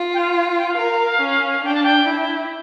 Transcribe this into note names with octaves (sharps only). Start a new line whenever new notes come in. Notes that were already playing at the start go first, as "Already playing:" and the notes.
Already playing: F4
G5
F5
F5
G5
F5
A#4
C#4
D4 G5
A5
G5
E4